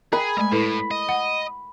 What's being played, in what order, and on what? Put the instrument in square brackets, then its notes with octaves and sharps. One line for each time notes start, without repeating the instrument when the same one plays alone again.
[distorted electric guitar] G#4 [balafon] A#4 G5 [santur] B5
[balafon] G#3 A3 [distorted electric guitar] G#5 A#5
[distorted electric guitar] A2 [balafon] E4 A4 B4
[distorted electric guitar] D#5
[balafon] F#5